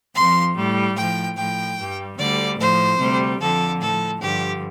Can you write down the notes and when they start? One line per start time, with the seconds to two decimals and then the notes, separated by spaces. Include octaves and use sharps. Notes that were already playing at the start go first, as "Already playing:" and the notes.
0.14 F2 F3 C6
0.55 A2 G3
0.95 A2 F3 G5
1.37 A2 F3 G5
1.78 G2 G3
2.18 D2 D3 G3 D5
2.58 A2 F3 C5
2.99 D2 C3 G3
3.40 F2 D3 F3 A4
3.80 A2 F3 A4
4.21 G2 D3 F3 G4